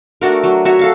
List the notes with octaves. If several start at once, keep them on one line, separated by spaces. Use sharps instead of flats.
A3 D4 F#4 A#4
F#3
F#4 C#5 E5
A4 F5 C#6